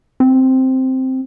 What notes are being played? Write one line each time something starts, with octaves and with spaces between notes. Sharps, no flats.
C4